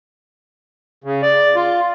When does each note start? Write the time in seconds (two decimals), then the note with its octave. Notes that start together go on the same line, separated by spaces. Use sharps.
1.04 C#3
1.22 D5
1.56 F4